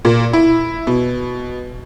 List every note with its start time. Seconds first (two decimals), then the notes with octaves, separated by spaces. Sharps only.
0.05 A#2
0.33 E4
0.87 B2